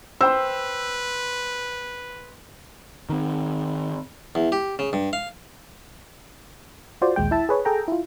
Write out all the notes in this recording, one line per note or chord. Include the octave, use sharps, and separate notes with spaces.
B4 C5 G5 C6 E6
D#3 C4
E2
G4
C#3
G2
F5
F4 F#4 C5 D5
A#1 D#2 G#3 G5
E4 E5 A5
G#4 B4 C#5
G#4 A4 G5 A#5
E4 F4